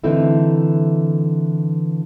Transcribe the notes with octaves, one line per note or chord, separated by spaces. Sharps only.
D3 E3 A3 C4 D#4 E4